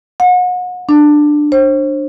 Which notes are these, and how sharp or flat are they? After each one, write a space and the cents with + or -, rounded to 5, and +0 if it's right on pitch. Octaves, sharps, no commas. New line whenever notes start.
F#5 -35
D4 +15
C5 +35